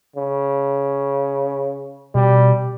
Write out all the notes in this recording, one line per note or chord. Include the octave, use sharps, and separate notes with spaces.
C#3
B2 G3